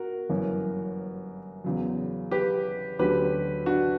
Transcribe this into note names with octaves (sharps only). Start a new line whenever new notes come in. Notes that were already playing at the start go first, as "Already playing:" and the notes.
Already playing: F#4 A#4
G1 F#2 E3 A#3 C#4
E2 C#3 F#3
G4 B4
D2 D3 F#3 C#4 G4 B4
D4 F#4